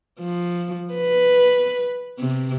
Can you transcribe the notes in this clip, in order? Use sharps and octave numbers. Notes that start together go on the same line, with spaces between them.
F3
B4
C3